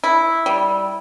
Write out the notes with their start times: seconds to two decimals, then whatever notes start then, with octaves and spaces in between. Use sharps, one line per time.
0.04 E4
0.46 G3